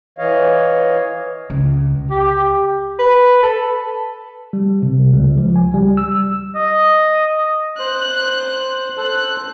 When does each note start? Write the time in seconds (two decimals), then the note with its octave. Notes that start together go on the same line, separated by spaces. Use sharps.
0.18 E3 C#5 D#5 F5
1.50 C#2
2.11 G4
2.99 B4
3.42 A4
4.53 G3
4.82 C3
5.13 C#2
5.38 F3
5.56 G#5
5.74 G3
5.97 E6
6.55 D#5
7.79 C5 F#6
8.97 A4 C5 F#6